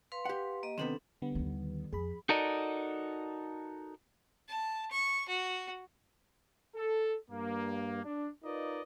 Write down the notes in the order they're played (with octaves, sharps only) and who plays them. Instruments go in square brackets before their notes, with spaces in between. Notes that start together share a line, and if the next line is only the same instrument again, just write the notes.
[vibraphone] B4 F5 C6
[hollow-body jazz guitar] G4 F#5
[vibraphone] A#3 D#5
[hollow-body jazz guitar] D#2 C3 B3 [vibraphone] C4 D4 A4
[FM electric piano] D3 G3 B3
[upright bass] D#2 D#3
[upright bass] F2 [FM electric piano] G#4 B5
[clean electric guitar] D#4 F#4 A4 A#4 D5 D#5
[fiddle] A5
C#6
F#4
[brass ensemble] A4
G2 A#3
D4
D#4 F4 A#4 B4 D5 D#5